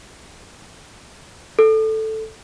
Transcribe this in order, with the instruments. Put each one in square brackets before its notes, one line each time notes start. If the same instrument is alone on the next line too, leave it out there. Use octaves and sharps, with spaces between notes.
[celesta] A4